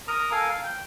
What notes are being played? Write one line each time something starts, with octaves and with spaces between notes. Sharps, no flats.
A#4 A#5 D#6
A4 A#4 F5 G#5
F5
G5